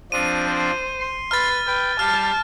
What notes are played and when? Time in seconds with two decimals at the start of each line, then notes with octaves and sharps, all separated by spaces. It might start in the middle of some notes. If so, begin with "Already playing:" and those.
0.12 F3 C4 D4 D#7
0.47 C5
1.00 C6
1.31 B4 F6 A6
1.67 B4 G5
1.99 G3 F5 A5 F6